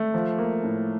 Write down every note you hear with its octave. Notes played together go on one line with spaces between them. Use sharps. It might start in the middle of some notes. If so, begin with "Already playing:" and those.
Already playing: A3
F3
A#3
A2